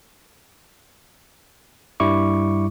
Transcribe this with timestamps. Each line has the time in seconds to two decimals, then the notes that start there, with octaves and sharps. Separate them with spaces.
2.00 G2 G3 E4 C#6 D6